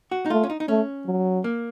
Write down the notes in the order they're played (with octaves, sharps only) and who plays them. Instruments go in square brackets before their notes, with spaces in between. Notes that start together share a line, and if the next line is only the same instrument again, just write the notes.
[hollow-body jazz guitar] F#4
D#4
[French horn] A3 [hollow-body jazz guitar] F4
[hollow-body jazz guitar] C#4
D#4
D#4
[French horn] A3 [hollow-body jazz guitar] C#4
[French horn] F#3
[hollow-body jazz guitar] A#3